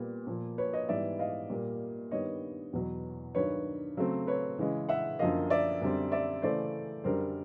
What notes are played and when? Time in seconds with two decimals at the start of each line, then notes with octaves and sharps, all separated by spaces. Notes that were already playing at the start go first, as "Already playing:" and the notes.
Already playing: A#2 G3 B3
0.27 A#2 F3 A#3
0.58 B4 C#5
0.73 C#5 D#5
0.89 G#2 E3 G3 B3 D5 E5
1.19 D#5 F5
1.50 A#2 G3 A#3
2.11 G2 D#3 G3 B3 C#5 D#5
2.73 E2 B2 F#3 B3
3.35 G2 D#3 F#3 B4 C#5
3.97 C#3 F#3 A3 C4
4.27 B4 C#5
4.58 C#3 E3 G#3
4.89 E5 F#5
5.19 F#2 D3 F3 A#3 D#5 F5
5.50 D5 E5
5.81 F#2 D3 G3 C4
6.12 D5 E5
6.42 C#3 E3 A3 C5 D5
7.04 F#2 D3 G3 A#4 C5